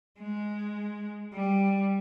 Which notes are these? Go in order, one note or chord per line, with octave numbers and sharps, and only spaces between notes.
G#3
G3